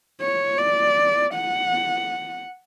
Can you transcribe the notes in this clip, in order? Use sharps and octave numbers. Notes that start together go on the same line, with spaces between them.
C#5
D5
F#5